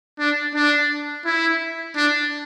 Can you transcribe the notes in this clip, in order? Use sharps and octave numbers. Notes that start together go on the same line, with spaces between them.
D4
D4
E4
D4